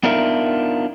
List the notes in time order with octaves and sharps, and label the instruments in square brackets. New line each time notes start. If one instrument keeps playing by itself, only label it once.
[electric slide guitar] B3 D4 D#4 F4 A#4 E5